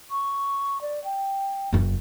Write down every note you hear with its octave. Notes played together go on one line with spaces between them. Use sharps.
C#6
D5
G5
F#1 F#2